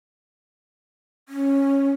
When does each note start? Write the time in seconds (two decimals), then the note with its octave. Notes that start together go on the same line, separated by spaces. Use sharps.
1.29 C#4